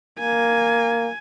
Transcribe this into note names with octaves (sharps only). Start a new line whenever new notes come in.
A#3 G#5